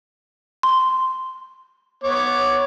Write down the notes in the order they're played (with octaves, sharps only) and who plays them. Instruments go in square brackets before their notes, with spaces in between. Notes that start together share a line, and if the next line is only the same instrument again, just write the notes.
[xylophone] C6
[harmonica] B3 C#5 D6